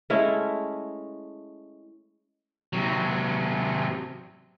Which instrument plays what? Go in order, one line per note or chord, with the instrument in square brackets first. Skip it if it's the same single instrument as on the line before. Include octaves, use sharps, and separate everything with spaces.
[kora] G#3 A3 C#4 E4
[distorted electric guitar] C3 F#3